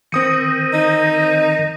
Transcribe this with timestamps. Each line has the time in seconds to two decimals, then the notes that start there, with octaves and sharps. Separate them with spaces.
0.12 D#3 C4 D#6 C#7
0.73 D#4